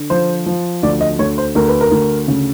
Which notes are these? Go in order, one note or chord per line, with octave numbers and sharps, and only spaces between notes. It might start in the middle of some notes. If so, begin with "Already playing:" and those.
Already playing: D3
F3 C5
F3
D2 D5
D#5
D2 C#5
C5
D2 A#4
B4
A#4
D2
C#3